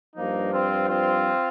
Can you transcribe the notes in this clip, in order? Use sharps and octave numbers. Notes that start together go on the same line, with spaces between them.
G2 F3 A#3 D#4
C4 F4
C4 F4